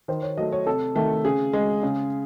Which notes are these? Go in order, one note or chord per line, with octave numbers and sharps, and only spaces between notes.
D#3 C5
C#5
F#3 A3 D#5
C#5
C3 A4
D#3 A3
C#3 G#4
G#3
C#3